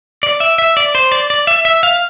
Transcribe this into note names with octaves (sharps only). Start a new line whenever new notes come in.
D5
E5
E5
D5
C5
D5
D5
E5
E5
F5